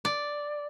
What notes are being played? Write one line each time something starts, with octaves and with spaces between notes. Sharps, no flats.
D5